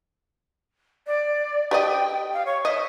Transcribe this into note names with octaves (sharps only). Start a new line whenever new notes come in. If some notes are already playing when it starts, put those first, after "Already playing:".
D5
G4 D5 D#5 G5
F5
C#5
D#5 E5